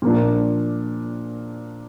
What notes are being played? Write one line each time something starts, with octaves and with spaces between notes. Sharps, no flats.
A#2 F3 A#3 D4